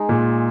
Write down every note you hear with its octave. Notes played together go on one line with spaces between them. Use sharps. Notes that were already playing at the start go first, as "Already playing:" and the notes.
Already playing: G#3 D#4 G#4
A#2